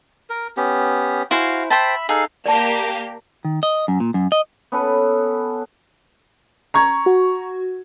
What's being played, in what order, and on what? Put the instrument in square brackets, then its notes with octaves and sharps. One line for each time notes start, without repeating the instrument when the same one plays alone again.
[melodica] A#4
B3 C#4 G4
[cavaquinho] E4 C5 G#5 [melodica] F#4 F5
[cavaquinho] C5 G5 A5 [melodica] E5 B5
[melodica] D#4 A4 F5 [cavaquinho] G#4
[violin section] A#3 G4 [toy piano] D5 A5
[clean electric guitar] D#3
D#5
F#2
A#2
F#2
D#5
[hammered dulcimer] B3 C#4 A4 B4
[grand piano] A#5 C#6 G#6
[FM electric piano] F#4